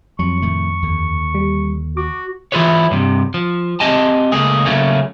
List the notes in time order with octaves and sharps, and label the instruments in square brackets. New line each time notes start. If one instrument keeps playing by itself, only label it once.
[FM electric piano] F2 [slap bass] F#3 [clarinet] C#6
[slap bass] A2 D#3 A3
D#2 D3
[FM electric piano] G3
[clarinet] F#4 [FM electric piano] D6
[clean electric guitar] E3 E4 F4 G#4 B4 C#5
G2 C3
F3
C4 G4 D#5 G#5 A5
C#2 A3 A#3 G#4
C#3 F#3 A3 A#3 C#4